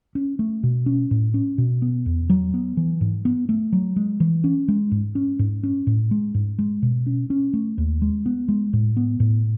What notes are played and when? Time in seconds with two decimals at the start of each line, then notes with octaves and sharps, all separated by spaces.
0.15 C#4
0.39 A3
0.63 B2
0.86 C#4
1.11 A2
1.34 C#4
1.58 B2
1.82 B3
2.06 E2
2.30 F#3
2.54 B3
2.77 E3
3.01 G#2
3.25 B3
3.49 A3
3.73 F#3
3.96 G#3
4.20 E3
4.44 C#4
4.68 G#3
4.92 G#2
5.15 C#4
5.39 G#2
5.63 C#4
5.87 A2
6.11 G#3
6.35 G#2
6.59 G#3
6.82 B2
7.06 C#4
7.30 C#4
7.53 A3
7.78 D#2
8.02 G#3
8.26 B3
8.48 G#3
8.73 A2
8.97 B3
9.20 A2